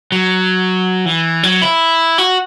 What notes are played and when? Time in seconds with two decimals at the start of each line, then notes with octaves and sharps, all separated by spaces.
0.12 F#3
1.06 E3
1.43 F#3
1.62 E4
2.18 F#4